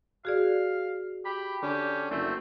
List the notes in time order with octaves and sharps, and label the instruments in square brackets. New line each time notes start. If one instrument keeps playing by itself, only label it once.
[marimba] F#4 G#4 D5 [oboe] F5
[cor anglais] G4 [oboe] B5
[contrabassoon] D3 [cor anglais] C#4 [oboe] G4
[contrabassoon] F#1 [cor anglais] A3 [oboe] C4